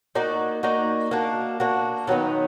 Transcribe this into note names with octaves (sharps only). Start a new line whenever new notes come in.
A#3 D#4 F#4 D5
A#3 D#4 F#4 D5
A#3 D4 F#4
A#3 D4 F#4
D#3 F#3 B3 D#4